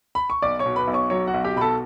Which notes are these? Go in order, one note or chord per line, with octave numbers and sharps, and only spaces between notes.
B5
C#6
B1 D5 D6
C#5 C#6
B2
B4 B5
B1
C#5 C#6
F#3 C#5 C#6
F#4 F#5
B1
G4 G5
B2 B5
A4 A5